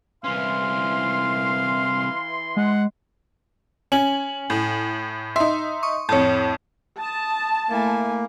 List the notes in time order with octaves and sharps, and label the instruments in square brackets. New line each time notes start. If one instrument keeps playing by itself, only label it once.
[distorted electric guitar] C2 C#4 [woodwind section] E3 C6 [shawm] F5
[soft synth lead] G#3 [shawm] F#5
[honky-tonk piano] C#4 [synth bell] G#5 F#7
[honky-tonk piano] A2
[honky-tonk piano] D#4 E5 [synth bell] C6
[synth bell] C#6 D#6
[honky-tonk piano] F2 A2 [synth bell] C#5 A5
[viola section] A5 [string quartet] D#6
[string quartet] A3 E4 G#5 [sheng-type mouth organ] A#3